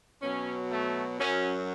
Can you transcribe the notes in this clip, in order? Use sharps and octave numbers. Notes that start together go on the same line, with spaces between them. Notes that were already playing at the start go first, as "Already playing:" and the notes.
B2 F#3 C#4
A3
F#2 F#3 C#4